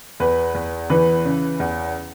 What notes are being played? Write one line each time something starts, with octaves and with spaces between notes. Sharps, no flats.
E2 B4
E2
E3 B4
C#3
E2